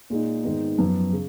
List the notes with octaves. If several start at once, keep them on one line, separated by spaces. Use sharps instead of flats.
A#2 G#3 D#4
G#2 D#3 G#3 B3 D#4
F#2 F3 B3
C#3